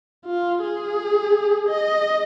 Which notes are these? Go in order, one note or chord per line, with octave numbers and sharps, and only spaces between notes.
F4
G#4
D#5